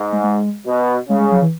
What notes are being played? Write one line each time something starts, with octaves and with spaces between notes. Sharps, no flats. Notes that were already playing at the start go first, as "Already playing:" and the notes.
Already playing: G#2
G#3
G#3
B2
C#3 G#3
G#3
F#3
E3